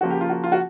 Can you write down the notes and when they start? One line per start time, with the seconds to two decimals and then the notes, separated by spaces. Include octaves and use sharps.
0.01 C#3 F3 A#3 F#4
0.10 G4
0.21 F4
0.29 F#4
0.44 F4
0.52 F#4